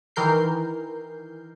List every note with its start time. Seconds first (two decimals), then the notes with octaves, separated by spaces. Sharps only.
0.16 D#3 E3 A#4 G6 C7